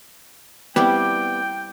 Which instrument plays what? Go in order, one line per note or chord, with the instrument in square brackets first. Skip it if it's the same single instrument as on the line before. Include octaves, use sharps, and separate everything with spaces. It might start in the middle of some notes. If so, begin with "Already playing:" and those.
[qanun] G3 C4 E4 [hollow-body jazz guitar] B3 G4 [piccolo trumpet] G5